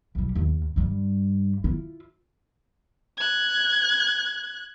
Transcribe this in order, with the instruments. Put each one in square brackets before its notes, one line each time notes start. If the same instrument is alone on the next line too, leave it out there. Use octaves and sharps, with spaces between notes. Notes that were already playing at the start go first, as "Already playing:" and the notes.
[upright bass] B1 G3
D#2
G2 G3
E4 F4
[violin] F#6 G#6